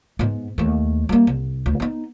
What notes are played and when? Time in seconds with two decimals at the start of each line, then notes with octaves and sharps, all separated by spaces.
0.19 G#2 B3
0.58 D#2 A3
1.09 G3 A#3
1.27 C2
1.66 D2
1.80 B3 D#4